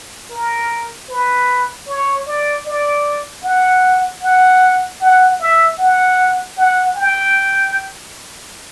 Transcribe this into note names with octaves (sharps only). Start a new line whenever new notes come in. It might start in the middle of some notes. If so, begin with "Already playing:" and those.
A#4
B4
C#5
D5
D5
F#5
F#5
F#5
E5
F#5
F#5
G5